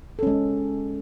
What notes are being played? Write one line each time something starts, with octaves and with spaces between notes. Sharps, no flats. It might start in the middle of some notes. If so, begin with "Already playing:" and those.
G#3 C#4 A4